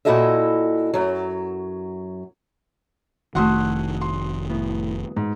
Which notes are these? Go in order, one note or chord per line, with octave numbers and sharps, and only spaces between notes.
A#2 E4 F#4 A4 D#5 E5
F#2 F#3
F1 D#3 A3 E4 F#4 F#5 C6 D#6
C6
A2 B3
G#2